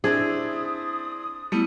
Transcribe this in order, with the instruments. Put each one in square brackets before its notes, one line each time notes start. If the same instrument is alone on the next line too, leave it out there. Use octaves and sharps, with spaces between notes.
[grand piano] C4 D4 E4 [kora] G#4
[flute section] D#6
[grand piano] G3 [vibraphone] A3 B3 E4